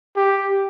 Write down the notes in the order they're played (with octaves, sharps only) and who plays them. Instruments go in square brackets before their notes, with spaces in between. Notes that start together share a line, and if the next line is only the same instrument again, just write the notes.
[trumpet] G4